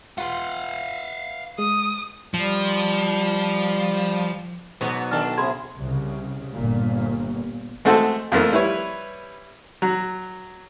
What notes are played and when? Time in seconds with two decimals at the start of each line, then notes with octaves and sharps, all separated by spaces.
0.18 F4 B4 F5 F#5 C6
1.58 G#3 D#6
2.34 F3 G3
4.81 G#2 B2 F#3 B3
5.11 D#3 D4 A4 A5 F6
5.38 C3 G#4 B5 C6 G#6
5.76 C2 C#3
6.53 G1 A#2
7.85 G#3 A3 C4 F#4 A4
8.32 F2 F3 A3 A#3
8.52 G3 E4 B4 C#5
9.82 F#3